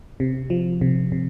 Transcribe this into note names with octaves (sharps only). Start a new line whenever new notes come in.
C3
F3
C3
C3